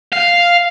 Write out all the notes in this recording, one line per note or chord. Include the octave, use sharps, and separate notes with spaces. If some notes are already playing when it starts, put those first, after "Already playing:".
F5